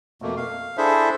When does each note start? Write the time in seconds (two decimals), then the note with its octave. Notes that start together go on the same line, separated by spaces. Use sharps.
0.22 F2 B2 A3 A#3
0.37 F5
0.77 D4 E4 G#4 A4 C5 E5